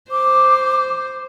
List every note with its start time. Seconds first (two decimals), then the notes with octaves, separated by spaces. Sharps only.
0.11 C5 D6